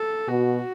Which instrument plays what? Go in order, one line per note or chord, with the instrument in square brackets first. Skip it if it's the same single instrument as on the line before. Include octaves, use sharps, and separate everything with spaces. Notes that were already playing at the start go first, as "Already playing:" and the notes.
Already playing: [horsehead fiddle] A4
[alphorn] B2 [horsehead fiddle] F#4